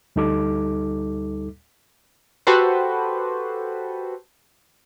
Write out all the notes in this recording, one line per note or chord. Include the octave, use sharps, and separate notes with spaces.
D2 G3 D#4 A4 D6
F#4 G4 A4 B4 C5